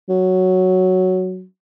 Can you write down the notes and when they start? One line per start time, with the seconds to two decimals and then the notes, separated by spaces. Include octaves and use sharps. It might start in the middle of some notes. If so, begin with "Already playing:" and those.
0.09 F#3